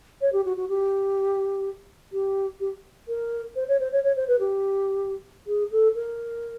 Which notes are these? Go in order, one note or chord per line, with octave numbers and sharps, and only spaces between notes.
C#5
G4
F#4
F#4
G4
G4
G4
A#4
C5
C#5
C5
C#5
C#5
C5
B4
G4
G#4
A4
A#4